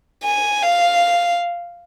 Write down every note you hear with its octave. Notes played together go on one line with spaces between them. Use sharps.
G#5
F5